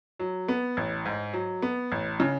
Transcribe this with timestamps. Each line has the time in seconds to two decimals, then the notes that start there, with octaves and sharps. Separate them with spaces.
0.19 F#3
0.48 B3
0.77 A1
1.05 G#2
1.33 F#3
1.62 B3
1.92 A1
2.20 C#3